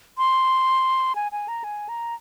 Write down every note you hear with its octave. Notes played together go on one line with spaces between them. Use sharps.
C6
G#5
G#5
A#5
G#5
A#5